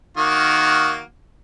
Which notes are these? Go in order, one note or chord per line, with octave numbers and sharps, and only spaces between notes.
D#3 A#3 F#4